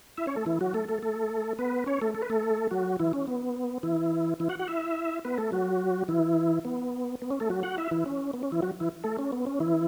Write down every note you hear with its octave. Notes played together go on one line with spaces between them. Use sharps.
E4 E5
C#4 C#5
A3 A4
E3 E4
F#3 F#4
A3 A4
A3 A4
A3 A4
B3 B4
C#4 C#5
A3 A4
A4
B4
A3 A4
F#3 F#4
E3 E4
C#4
B3
E3 E4
E3 E4
F#4 F#5
F#4 F#5
E4 E5
B3 B4
A3 A4
F#3 F#4
E3 E4
B3
B3
C#4
A3 A4
F#3 F#4
F#4 F#5
E4 E5
E3 E4
C#4
B3
C#4
E3 E4
F#3 F#4
E3 E4
A3 A4
C#4
B3
C#4
E3 E4